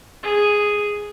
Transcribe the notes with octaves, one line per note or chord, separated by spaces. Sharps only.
G#4